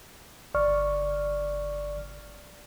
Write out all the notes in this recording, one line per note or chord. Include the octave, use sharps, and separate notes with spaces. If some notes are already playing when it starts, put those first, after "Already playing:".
G1 D5 C#6 F6